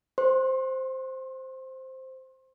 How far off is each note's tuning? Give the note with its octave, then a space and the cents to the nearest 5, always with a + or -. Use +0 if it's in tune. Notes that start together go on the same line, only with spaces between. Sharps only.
C5 +0 C6 +35